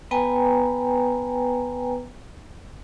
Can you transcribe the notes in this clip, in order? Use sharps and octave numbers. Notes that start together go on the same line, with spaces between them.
B3 B4 G5 G#5 A#5